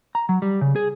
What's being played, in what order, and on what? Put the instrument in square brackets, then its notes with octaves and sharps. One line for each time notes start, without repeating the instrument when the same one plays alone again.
[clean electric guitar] A#5
F#3
G3
C#3
G#4